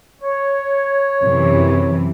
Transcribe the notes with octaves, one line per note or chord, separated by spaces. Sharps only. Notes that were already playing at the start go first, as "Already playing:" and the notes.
C#5
F#2 C3 E3